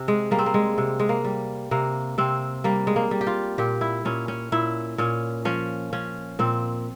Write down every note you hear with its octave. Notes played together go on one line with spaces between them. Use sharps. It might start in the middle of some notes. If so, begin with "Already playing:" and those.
Already playing: C3
G#3
G3 A#3
C4
A#3
G#3
C3
G#3
A#3
G3
C3 A#3
C3 C4
G3 A#3
G#3
A#3
G3
G4
F4
A#2 G4
E4
A#2 C#4
C#4
A#2 E4
A#2 C#4
F3 C#4
F3 C#4
A#2 C4